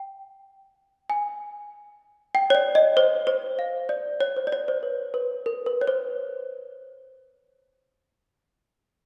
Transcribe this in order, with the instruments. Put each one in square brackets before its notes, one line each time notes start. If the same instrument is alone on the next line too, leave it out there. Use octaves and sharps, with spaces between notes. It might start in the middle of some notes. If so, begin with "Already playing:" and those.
Already playing: [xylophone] G5
G#5
G5
C#5
D5
D#5
C5
C5
F5
D5
C#5
C5
D5
C#5
C5
B4
B4
A#4
B4
C#5
C5